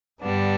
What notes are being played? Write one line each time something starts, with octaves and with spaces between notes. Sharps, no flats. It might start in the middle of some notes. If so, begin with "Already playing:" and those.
G2 D3 G3 B3 D4